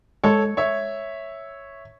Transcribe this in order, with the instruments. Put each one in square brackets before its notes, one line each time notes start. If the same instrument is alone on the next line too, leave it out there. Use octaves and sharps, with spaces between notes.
[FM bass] G#3 [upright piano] A4 C#5
[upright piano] C#5 E5